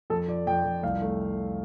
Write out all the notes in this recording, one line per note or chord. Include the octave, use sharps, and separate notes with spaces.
F2 A4
F3 D5
F2 G5
F2
C2 F5
A3